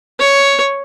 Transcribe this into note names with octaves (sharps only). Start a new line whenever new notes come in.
C#5